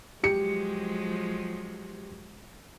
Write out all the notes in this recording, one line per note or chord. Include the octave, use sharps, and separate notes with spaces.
F3 F#3 G#3 G4 C#7